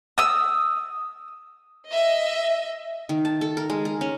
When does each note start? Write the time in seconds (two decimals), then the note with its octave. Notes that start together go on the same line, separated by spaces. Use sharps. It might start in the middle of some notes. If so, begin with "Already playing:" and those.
0.18 D#6 E6
1.89 D#5 E5
3.09 D#3
3.25 A5
3.41 A4
3.57 A#4
3.70 G#3
3.85 A#4
4.01 C#4